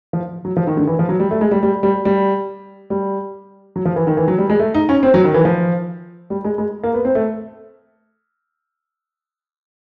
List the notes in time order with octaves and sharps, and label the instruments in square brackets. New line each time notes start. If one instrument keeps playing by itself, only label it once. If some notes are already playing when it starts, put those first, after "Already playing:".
[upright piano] F3
F#3
F3
D#3
D3
E3
F3
F#3
G3
A3
G#3
G3
G3
G3
G3
G3
F#3
F3
E3
D#3
E3
F#3
G3
G#3
A3
D#4
C#4
C4
F#3
D#3
E3
F3
G3
G#3
G#3
A#3
B3
C4
A3